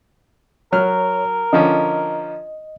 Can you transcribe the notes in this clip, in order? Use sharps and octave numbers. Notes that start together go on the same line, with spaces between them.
F#3 A#4 C#5 F6
D3 F3 C#4 D#5